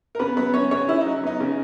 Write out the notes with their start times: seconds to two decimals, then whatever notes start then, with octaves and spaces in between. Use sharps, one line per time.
0.15 A#4
0.19 C#3 B3 B4
0.37 F#3 B3 B4
0.54 B3 C#4 C#5
0.71 C#3 C#4 C#5
0.88 C#3 E4
1.01 D#4
1.06 F#3
1.23 B3 D#4
1.40 C#3